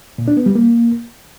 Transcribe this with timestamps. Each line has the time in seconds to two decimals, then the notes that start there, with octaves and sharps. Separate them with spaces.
0.18 A#2
0.28 D4
0.37 B3
0.46 G3
0.55 A#3